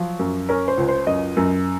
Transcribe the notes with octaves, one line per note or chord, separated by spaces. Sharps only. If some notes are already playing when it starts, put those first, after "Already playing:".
Already playing: F3 F#3
F#2
C#4 A#4
C5
C#2
C5
F#2 D#5
F#2